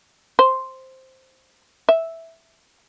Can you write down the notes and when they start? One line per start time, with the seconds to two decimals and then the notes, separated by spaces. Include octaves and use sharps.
0.39 C5
1.89 E5